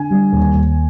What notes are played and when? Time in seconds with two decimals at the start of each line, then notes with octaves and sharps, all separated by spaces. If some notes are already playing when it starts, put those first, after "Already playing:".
Already playing: D3 G#5
0.11 G3
0.32 D#2
0.54 D#2